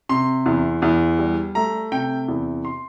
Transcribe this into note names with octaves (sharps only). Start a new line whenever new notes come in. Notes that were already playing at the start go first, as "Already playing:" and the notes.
C3 C6
E2
E2
G3
A3 A#5
C3 G5
E2
C6